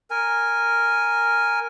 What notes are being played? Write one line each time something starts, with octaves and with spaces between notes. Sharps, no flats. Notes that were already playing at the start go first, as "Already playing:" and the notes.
A#4 G#5